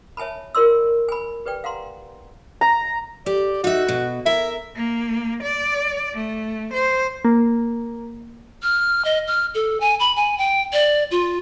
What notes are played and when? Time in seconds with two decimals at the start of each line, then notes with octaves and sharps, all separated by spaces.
0.17 C#5 E5 G#5 A5 B5
0.55 F4 A#4 D5 C6 E6
1.09 G#5 B5
1.46 G4 B4 D5 G5
1.64 F5 F#5 A#5 C6
2.61 A#5
3.26 G4 D5
3.64 D#4 F#4 E5
3.88 B2
4.26 A#4 E5
4.76 A#3
5.43 D5
6.14 A3
6.74 C5
7.25 A#3
8.62 F6
9.05 D#5
9.27 F6
9.54 A4
9.80 G#5
10.00 B5
10.16 G#5
10.38 G5
10.73 D5
11.11 F4